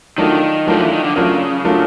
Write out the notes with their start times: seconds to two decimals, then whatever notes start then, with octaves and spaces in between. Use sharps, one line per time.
0.18 D#3 F#3 A3 D4 F4 A#4
0.67 F3 F#3 A3 D4 F4 A#4
0.81 E3
0.93 D#3
1.04 D3
1.16 C#3 F#3 A3 D4 F4 A#4
1.64 F#3 A3 D4 F4 A#4